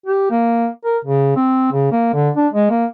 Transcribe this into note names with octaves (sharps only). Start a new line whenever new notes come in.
G4
A#3
A#4
C#3
C4
C#3
A#3
D3
D4
G#3
A#3